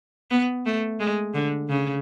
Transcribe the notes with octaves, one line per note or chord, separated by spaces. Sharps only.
B3
A3
G#3
D3
C#3